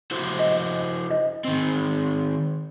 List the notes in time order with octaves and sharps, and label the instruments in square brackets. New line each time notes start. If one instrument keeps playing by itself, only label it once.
[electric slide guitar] E4 F#4 C5
[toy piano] D#5
D#5
[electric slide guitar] D#3 C4